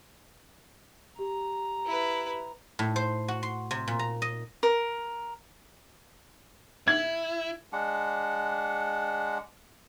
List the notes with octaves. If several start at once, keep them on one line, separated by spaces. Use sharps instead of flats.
G4 A#5
E4 B4
A2
C5
F#4
C6
C3
A#2
A#5
D#5
A#4
E4 G#6
G#3 D4 F#5